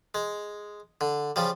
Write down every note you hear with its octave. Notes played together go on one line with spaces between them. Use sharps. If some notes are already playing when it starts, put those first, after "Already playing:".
G#3
D3
C#3 F3 G3